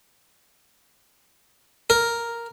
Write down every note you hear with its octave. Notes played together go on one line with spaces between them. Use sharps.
A#4